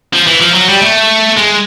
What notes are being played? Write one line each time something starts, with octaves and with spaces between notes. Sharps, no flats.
F3
E3
F3
F#3
G3
A3
G#3